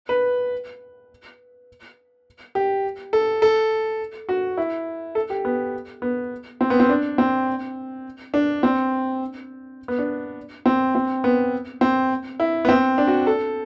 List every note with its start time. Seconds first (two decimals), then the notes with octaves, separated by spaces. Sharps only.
0.09 B4
2.55 G4
3.13 A4
3.42 A4
4.29 F#4
4.57 E4
5.15 A4
5.30 G4
5.45 B3
6.02 B3
6.61 C4
6.70 B3
6.80 C4
6.89 D4
7.18 C4
8.34 D4
8.63 C4
9.88 B3
9.99 D4
10.66 C4
10.95 C4
11.24 B3
11.81 C4
12.40 E4
12.65 B3
12.69 C4
12.98 D4
13.07 F#4
13.27 A4